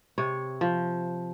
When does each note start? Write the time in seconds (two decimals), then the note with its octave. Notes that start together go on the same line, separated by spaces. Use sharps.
0.18 C3 C#5
0.61 F3